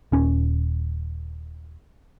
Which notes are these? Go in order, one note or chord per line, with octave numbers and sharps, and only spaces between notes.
D#1 C#4